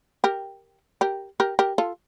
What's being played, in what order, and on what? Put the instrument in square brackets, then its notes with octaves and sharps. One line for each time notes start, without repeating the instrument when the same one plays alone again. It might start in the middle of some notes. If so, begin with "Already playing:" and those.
[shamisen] G4 A#4
G4 A#4
G4 A#4
G4 A#4
F4 A4